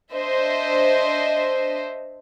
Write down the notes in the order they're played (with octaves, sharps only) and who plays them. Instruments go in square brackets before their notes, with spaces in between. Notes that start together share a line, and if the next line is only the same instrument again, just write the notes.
[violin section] D4 C5 D#5 E5